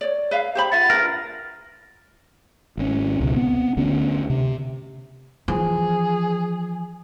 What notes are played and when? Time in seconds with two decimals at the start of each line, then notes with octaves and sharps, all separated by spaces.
0.01 C#5 D5
0.31 B4 E5 F5
0.55 G4 C5 B5
0.72 F4 E5 F#5 A6
0.90 D4 F4 A#4 B4
2.78 G#1 C3 C#4
3.21 C#2 B2
3.36 B3 C4
3.77 D2 D3 B3 C#4
4.30 C3
5.48 E3 F3 G#4